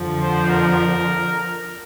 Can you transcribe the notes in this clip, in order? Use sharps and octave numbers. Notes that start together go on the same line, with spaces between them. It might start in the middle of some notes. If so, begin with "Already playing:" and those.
Already playing: F2 D3 F3
C5
A#4